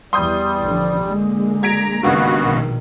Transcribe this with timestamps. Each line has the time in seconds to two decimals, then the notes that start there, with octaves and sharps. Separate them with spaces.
0.13 E2 E3 G3 C6 D#6 G6
0.60 A1 D3 F3
1.01 D3 G#3 A#3
1.63 A#5 G#6 B6 D7
2.03 G#1 C#2 G2 B3 F#4
2.41 A#1 B2 D#3